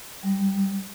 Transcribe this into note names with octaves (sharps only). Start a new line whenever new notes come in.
G3